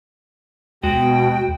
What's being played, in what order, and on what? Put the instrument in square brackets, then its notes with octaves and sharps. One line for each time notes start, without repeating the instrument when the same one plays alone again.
[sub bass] D#2 [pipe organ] B2 [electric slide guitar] G#3 F#4 [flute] G5